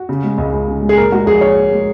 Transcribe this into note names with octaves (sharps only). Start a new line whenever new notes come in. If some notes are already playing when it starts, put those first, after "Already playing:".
Already playing: F#4
C#3
G#3
C#2
C#2
C#3
G#3
G#4
A#2 A#4
G#3 F#4
A#1 G#4
A#1 C#5
A#2
G#3